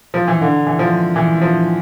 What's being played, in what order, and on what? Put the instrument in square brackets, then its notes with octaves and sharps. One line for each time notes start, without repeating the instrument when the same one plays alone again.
[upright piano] F3
E3
D3
E3
F3
E3
F3